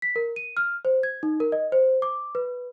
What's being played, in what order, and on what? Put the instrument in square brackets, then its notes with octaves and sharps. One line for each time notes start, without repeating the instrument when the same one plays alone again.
[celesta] B6
A#4
D#7
F6
C5
G#6
D#4
A#4
D#5
C5
D6
B4